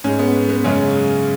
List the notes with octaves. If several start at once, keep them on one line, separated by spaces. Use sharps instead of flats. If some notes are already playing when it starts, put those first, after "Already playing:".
G#2 G#3 C#4
B3
B3
F#2 C#3 G#3 C#4